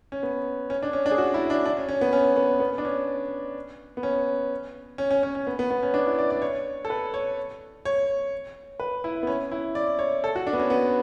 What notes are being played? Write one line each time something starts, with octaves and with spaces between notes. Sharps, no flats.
C#4
B3
C#4
D4
C#4
D4
G#4
F#4
E4
D4
D4
C#4
C#4
B3
C#4
B3
B3
D4
C#4
B3
C#4
C#4
C#4
C#4
C#4
B3
B3
B3
C#4
D4
E4
D5
D5
C#5
A4
B4
C#5
C#5
B4
E4
B3
C#4
E4
D5
C#5
A4
F#4
D4
B3
C#4
B3